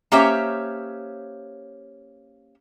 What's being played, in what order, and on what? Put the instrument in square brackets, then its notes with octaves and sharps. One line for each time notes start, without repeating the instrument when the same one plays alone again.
[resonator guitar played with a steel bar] A#3 C#4 G4 C5 C#5 E5